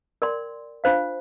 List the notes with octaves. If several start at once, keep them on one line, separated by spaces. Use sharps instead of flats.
A#4 D5 G5 C6
D4 F4 C5 F5